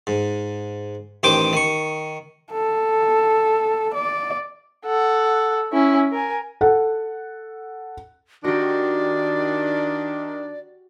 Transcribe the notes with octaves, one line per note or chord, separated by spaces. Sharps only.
G#2
A1 D#3 C5 G5 D6
D#3 C#6
A4
D5
A4 F#5
C#4 E4
A#4 G#5
A4 F#5
D#3 D4 F#4 G4 D5